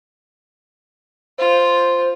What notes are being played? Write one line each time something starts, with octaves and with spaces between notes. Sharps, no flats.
F4 C5